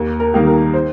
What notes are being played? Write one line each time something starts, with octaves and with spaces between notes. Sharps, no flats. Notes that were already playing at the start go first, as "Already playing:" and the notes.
Already playing: D#2
A#4
D#3 G3 A#3 D#4
A#4
C5